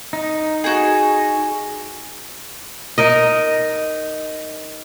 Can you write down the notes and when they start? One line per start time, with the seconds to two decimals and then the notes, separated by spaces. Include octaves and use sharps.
0.13 D#4
0.64 F#4 G#4
2.98 D#4 A#4 D#5